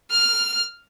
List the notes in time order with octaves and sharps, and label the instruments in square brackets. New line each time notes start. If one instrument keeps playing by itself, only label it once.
[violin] F6